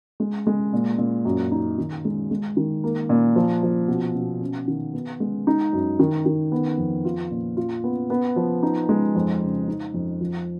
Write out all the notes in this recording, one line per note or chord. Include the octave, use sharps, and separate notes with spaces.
G#3
G#3
A#2
A#2
F#2
D#4
D#3
G#3
G#3
D#3
A#3
A#2
F3
F3
B2
B2
C#4
D#3
B3
G#3
D#4
F#2
D#3
D#3
B3
F2
F4
A#2
F4
B3
B3
F3
D#4
G#3
F2
C#3
D#4
F2
F3